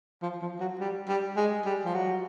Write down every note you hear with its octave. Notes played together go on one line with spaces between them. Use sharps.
F3
F3
F#3
G3
G3
G#3
G3
F3
F#3